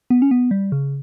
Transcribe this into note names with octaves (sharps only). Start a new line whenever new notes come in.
B3
C#4
B3
G3
C#3